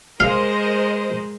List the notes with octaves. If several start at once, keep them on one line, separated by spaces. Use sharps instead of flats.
G#3 A#4 C5 D#5 F5